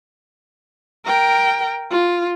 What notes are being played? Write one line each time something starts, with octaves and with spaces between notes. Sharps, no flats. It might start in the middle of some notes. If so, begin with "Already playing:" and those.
A#4 G5
F4